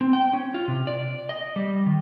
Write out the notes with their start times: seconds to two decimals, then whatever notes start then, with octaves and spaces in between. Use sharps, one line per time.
0.01 C4
0.13 G5
0.33 C#4
0.54 F4
0.68 C3
0.87 D5
1.29 D#5
1.56 G3
1.86 D#3